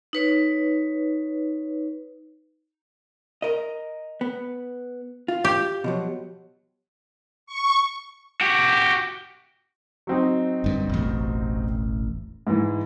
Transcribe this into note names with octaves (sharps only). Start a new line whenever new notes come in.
D#4 B4 C#5
A#4 D#5
B3
F4
G4
B2 F3 F#3
C#6
F#4 G4
F#3 C4 D#4
G1 G2
E1 A1
G#2 E3